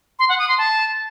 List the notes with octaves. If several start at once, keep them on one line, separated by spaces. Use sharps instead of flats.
C6
F#5
D#6
C6
A5